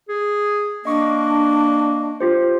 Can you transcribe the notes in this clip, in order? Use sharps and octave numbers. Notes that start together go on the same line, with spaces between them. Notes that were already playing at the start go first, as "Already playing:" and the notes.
G#4
A#3 D4 D#5 C#6 D6
F4 G4 C5